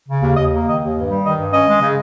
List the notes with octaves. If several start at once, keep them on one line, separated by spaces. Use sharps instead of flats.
C#3
D#2
D#2 D#5
A#3
D#3 D#5
D#2
G2
G3
D#3 D#5
G2
C#4 D#5
G#3
C#3